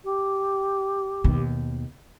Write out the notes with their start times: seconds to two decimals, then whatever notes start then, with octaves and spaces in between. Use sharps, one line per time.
0.04 G4
1.24 D#2 B2